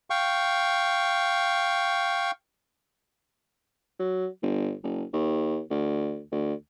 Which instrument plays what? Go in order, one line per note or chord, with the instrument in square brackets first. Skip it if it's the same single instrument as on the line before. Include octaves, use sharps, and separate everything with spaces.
[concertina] F5 G5 C#6
[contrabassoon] F#3
G1
F#1
D#2
D2
D2